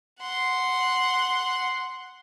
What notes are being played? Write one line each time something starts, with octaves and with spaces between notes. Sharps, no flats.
F#5 C6